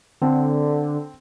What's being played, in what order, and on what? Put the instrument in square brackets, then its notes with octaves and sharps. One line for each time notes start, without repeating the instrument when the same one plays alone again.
[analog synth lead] D3 [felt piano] C4